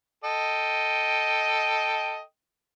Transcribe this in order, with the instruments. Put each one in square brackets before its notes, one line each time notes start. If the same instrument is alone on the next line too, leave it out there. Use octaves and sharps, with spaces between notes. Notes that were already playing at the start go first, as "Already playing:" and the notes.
[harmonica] A4 D#5 G5